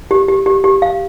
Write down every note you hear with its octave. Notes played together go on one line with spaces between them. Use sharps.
G4
G4
G4
G4
F5